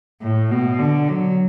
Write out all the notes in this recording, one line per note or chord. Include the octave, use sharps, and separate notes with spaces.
A2
B2
D3
F#3